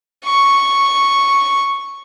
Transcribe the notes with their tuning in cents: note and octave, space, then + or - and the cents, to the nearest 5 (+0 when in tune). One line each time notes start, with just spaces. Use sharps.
C#6 -5